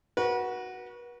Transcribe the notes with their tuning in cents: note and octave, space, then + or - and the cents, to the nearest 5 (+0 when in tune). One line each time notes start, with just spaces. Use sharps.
F#4 +0 B4 -40